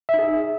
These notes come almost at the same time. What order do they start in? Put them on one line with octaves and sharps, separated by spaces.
E5 D#4 G#4